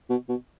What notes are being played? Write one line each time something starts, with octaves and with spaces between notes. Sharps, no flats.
B2
B2